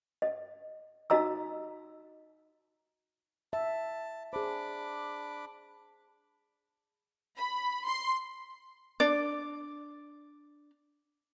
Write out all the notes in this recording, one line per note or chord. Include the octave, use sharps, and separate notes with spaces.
D#5
D#4 F#4 D#5 A#5 E6
E5 A5
D4 G#4 C5 B5 D6
B5
C6
D4 D5